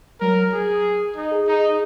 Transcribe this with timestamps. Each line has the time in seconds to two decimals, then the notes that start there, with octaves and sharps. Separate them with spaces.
0.21 F#3 A#4
0.53 G#4
1.16 D#4
1.31 G#4
1.47 D#4 G#4